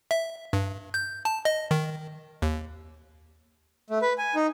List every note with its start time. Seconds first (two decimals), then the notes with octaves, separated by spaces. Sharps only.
0.11 E5
0.53 G2
0.94 G6
1.25 A5
1.45 D#5
1.71 D#3
2.42 D#2
3.90 A3
4.02 B4
4.18 G#5
4.35 D#4